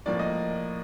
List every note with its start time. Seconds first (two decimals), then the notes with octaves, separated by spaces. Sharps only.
0.06 A2 F3 A#3 D5
0.19 D#5